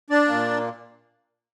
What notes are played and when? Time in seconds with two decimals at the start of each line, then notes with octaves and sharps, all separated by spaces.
0.10 D4 D5
0.28 A#2 A#3